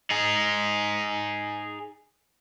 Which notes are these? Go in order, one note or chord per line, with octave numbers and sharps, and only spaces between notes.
D#4 G#4